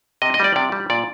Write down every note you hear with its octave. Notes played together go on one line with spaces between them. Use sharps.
C3 D#5
D#5
G3 D5
C3 D5
G3
A#2 D5